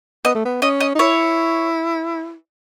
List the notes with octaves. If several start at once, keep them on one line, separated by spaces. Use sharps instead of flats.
B3 D#5
A3
B3
C#4 D#5
D#5
D#4
E4 C#5